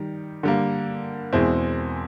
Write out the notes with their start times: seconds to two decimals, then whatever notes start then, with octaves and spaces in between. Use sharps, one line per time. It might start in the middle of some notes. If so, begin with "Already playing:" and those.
Already playing: D#3 G3
0.43 D3 G3 A#3
1.32 E2 B2 G#3 C4 E4